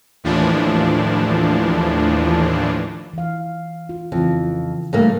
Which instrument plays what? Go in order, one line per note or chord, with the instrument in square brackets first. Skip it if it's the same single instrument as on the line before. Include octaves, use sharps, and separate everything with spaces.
[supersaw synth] D#2 A2 E3 F3 D4
[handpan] E3 F5
F4
[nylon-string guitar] F2 [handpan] C#3 E3
[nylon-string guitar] G2 A3 A#3